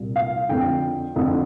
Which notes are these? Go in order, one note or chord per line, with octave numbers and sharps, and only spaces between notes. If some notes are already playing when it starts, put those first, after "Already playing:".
Already playing: C2 A#2
F5
F2 D3 G5
F2 D3